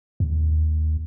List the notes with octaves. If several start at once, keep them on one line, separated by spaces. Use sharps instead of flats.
D#2